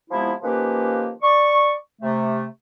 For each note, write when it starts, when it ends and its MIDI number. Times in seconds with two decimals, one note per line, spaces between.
0.10 0.32 48
0.10 0.32 53
0.10 0.32 56
0.10 0.32 59
0.10 0.32 64
0.42 1.10 51
0.42 1.10 53
0.42 1.10 58
0.42 1.10 61
0.42 1.10 67
0.42 1.10 71
1.21 1.72 74
1.21 1.72 85
2.02 2.44 48
2.02 2.44 57